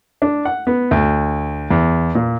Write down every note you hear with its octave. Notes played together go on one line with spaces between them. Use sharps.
D4
F#5
B3
D2
E2
A#2